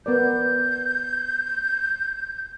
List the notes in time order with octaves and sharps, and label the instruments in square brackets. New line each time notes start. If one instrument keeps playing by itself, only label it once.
[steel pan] B3 A#4 D5 [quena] G6